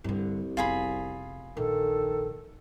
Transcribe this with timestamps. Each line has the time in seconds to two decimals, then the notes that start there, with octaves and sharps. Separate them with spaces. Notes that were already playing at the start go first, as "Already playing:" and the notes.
0.04 C2 G2 D3
0.57 F1 B3 F4 G#4 B5
1.57 A#1 D#3 A4